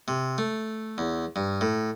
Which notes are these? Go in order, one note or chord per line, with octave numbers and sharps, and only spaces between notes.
C3
A3
E2
G2
A2